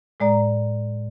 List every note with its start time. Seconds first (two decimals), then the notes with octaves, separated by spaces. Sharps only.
0.20 A2 G#3 D5 A#5